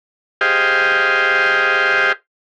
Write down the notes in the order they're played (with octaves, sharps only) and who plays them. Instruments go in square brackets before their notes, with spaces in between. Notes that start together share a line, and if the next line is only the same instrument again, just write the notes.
[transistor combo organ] G4 G#4 C5 D#5 F5 G5